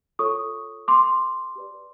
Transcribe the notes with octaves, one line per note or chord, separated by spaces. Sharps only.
F4 A4 C#5 C#6 D#6
C6 D6
G4 B4 D5